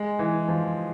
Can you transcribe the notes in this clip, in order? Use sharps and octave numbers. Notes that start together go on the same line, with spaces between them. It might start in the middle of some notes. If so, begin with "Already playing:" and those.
Already playing: G#3
E3
F3